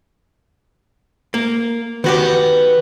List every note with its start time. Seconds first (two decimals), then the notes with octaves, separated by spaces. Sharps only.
1.34 A#3
2.04 D#3 B3 F#4 G4